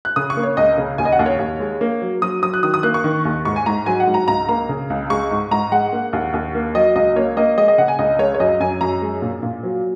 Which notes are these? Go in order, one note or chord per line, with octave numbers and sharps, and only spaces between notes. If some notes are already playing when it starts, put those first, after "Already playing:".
F#6
C#3 D#6
C#6
A#3
C#5
C#2 D#5
C#3
D#2 G#5
D#5
F#5
D#2
C#5
D#2
G#3
A#3
F#3
F#3 D#6
F#3 D#6
F#6
D#3 D#6
D#6
A#3 F#6
C#6
D#3
D#2
G#2 C#6
G#5
G#2 A#5
F#3 G#5
F#5
G#2
A#5
C#2 A#5
A#3 A#5
C#3
C#2
G#3 C#6
G#2
G#2 A#5
G#3 F#5
A#3
D#2
D#2
A#3
F#3 D#5
C#2 D#5
A#3 C#5
A#3 D#5
G#3 D#5
D#5
C#3 F#5
G#5
C#2 D#5
G#3 C#5
C#5
F#2 D#5
F#2 G#5
F#2 A#5
G#3
A#2
A#2
F#3